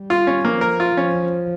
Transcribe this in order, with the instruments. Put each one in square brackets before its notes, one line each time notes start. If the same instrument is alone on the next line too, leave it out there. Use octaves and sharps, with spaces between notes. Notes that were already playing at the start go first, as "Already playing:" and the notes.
Already playing: [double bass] G3
[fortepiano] F4
C#4
[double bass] F3 [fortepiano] A#3
[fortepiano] A#4
F4
[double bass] F3 [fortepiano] C#4